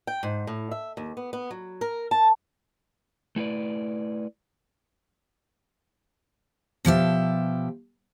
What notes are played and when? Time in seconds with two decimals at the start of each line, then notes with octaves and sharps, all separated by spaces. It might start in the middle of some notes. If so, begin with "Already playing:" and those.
0.07 G5
0.23 G#2
0.47 A2
0.71 E5
0.97 D#2
1.17 B3
1.33 B3
1.51 F#3
1.81 A#4
2.11 A5
3.36 A3 E4 B4 D5
6.85 B2 F3 G4 E5